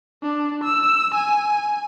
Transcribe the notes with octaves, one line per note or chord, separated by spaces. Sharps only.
D4
E6
G#5